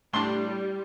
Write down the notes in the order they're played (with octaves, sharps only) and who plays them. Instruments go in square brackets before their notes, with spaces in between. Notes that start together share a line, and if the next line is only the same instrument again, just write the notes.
[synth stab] A2 D4 [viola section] G3 [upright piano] C6 G7